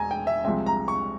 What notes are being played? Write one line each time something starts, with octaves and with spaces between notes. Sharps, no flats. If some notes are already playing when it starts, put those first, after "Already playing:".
Already playing: E1 G#5 A#5
G5
E5
C2 C3 F3 G#3 C4 E5
A#5
C#6